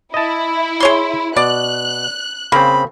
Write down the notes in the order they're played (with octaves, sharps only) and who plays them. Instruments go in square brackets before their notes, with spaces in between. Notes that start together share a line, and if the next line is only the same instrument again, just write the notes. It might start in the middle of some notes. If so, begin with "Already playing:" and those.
[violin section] E4 [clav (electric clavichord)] D#5 A5
[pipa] G#4 C#5 C6
[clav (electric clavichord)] B2 [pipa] D5 [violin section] F#6
[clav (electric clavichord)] C#3 C4 [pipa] A#3 [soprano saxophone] B5